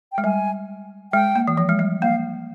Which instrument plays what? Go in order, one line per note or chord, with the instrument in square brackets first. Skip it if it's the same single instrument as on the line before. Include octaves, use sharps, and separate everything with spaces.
[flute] G5
[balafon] G#3
[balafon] G3 [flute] G#5
[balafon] G#3 [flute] G5
[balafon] A#3
E3
F3
G#3
G3
[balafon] A#3 [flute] F5